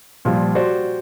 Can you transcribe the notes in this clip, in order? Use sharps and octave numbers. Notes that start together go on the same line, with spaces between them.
A#2 F3 G3
F#4 G4 C5 D5